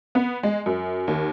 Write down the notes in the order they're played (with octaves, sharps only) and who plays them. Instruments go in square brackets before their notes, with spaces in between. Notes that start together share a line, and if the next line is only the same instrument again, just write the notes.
[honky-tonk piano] B3
G#3
F#2
D#2